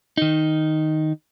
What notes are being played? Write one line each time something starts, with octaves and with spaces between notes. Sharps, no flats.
D#3 D#4